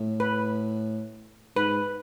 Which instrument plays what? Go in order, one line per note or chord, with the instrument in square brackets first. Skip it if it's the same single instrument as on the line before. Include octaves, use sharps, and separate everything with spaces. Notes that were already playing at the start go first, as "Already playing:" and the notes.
Already playing: [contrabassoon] A2
[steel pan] B4
[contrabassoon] G#2 [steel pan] B4